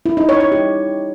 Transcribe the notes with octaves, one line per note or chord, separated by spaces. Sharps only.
E4
D#4
C#5
C#5
G4